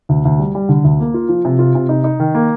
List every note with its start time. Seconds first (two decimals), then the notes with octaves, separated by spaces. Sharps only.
0.09 D2
0.25 D2
0.39 G3
0.55 G3
0.69 D3
0.84 D2
1.00 A#3
1.14 F4
1.29 F3
1.45 C3
1.59 F4
1.75 C3
1.89 D#4
2.04 D#4
2.20 D#3
2.35 A#3